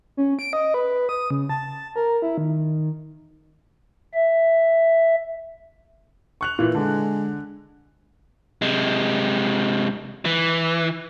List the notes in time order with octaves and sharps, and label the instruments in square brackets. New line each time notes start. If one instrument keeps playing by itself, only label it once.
[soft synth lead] C#4
D7
D#5
B4
D#6
C#3
A5
A#4
E4
D#3
[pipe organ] E5
[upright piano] C#6 F#6 F7
A#2 E3
[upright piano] D3 [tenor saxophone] G#3
[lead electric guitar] C3 G#3
E3